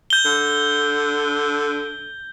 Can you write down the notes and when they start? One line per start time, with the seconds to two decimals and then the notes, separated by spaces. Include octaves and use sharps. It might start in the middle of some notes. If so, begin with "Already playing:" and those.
0.10 G6 G7
0.25 D3